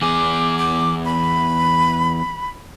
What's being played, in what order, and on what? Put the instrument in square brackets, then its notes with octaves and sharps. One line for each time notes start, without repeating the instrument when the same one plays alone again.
[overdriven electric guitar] E2 G#4 [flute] D6
[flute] D6
B5